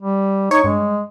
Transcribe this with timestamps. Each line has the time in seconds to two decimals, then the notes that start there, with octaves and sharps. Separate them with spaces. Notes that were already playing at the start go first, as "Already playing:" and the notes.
0.02 G3
0.51 D#4 C#5 C#6
0.64 G2 G#3